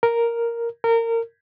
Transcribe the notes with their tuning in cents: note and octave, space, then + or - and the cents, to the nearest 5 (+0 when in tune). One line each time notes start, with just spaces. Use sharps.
A#4 +0
A#4 -25